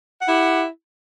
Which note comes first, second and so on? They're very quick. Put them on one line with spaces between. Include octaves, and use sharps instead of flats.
F#5 E4 G4